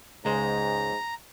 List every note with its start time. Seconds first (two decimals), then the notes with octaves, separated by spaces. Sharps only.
0.25 C#2 G#2 G#3 C5 A#5